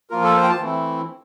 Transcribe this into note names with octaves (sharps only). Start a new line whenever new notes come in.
F3 A#3 F4 A#4
A4
C5
G5
A5
E3 A3 C4 E4